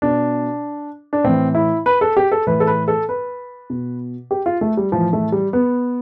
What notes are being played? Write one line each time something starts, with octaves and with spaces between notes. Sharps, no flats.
B2 D4
D4
A2 E3 C4
E4
B4
A4
G4
A4
A2 E3 B4
A4
B4
A4
B4
B2
G4
F4
A3
G3
A2 E3 F3
A3
G3
B3